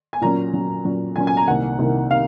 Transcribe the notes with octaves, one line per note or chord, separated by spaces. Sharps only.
G#5
A#2 F#3 C#4 A#5
A#2 F#3 C#4
A#2 F#3 C#4
A#2 F#3 C#4 G#5
G#5
A#5
C2 C3 D#3 A#3 F#5
C2 C3 D#3 A#3
C3 D#3 F5